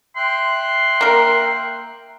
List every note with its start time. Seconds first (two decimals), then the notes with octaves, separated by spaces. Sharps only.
0.17 E5 G5 C6 F#6
1.01 A#3 A#4